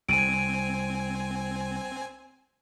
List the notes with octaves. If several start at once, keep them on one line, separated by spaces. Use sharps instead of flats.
C2 C4 G#5 D7 D#7